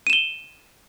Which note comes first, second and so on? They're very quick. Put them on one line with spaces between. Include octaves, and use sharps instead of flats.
D#7 E7 G7